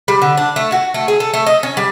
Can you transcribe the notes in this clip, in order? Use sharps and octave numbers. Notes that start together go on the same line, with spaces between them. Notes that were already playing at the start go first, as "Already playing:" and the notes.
G3
D3
D4
A3
F#4
A3
G#4
A4
A3
D#5
C#4
G3